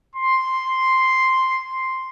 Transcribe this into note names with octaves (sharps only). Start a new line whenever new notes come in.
C6